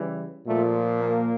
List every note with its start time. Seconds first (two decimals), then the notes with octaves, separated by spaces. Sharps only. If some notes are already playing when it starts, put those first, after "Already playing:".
Already playing: C#3 E3 G3
0.46 A#2 F3 A3
1.00 A#3